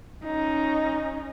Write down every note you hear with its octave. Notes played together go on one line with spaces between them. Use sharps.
C#4 D#4